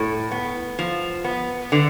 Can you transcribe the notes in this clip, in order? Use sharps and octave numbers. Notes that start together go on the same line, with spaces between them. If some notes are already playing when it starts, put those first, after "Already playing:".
Already playing: A2
B3
F3
B3
D3